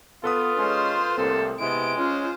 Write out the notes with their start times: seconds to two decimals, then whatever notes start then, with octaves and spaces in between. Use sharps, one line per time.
0.24 B3 F4 A4 B4 D#6
0.57 G#3 C#4 C5 C6
1.18 C2 A2 A#3 C4 A4
1.60 C3 G#3 B3 E4 D7
1.97 C#4 F4 C5